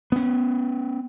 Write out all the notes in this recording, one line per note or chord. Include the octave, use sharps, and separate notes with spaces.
B3 C#4